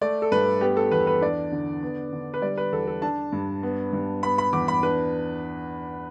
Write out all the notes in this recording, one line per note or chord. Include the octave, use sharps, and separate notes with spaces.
A3 D5
A4
G2 B4
B3 G4
A4
E2 B4
B4
D4 D5
D3
B3
D3
B4
G3 D5
B4
E2 A4
A4
D4 A5
G2
B3
G2
B3 B5
B5
E2 D6
B5
D4 B4